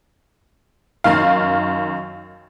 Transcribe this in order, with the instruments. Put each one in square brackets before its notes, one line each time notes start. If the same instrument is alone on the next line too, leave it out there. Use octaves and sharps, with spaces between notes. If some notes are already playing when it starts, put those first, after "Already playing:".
[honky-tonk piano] F#2 D#3 F5